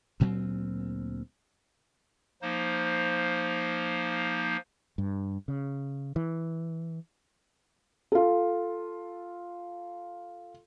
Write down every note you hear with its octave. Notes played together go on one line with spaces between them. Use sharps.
D2 A#2 F#3 C4
F3 A#3 D#4 C5
G2
C#3
E3
F4 A4